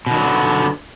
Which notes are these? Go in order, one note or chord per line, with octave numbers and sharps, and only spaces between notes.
B2 D3 D#3 F#3 B3